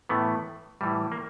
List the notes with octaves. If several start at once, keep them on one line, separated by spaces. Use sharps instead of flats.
A2 E3 A3 B3
A2 E3 G3
A#3